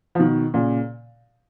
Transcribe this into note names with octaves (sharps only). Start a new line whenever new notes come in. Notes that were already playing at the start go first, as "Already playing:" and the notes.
F3
B2 D#3
A#2 C#3